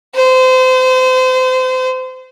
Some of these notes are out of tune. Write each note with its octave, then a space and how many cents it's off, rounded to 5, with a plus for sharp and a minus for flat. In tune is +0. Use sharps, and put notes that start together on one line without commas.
C5 -30